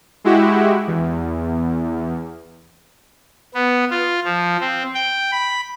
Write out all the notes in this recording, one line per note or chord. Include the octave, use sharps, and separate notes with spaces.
G#3 E4 F#4 G4
E2
B3
F4
F3
C4
G5
B5